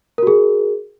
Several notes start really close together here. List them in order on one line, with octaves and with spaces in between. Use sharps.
A#4 F#4 G#4